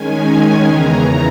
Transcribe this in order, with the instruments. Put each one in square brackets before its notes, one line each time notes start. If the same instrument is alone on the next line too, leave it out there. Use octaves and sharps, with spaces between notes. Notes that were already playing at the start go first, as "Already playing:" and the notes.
Already playing: [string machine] D#3 G#3 C#4 G#5
E2 C#3 E3 A#5